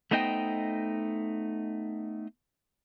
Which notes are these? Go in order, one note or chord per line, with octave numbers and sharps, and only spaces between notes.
A3 B3 D#4 C5 D#5 G5